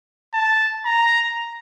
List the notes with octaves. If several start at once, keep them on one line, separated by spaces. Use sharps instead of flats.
A5
A#5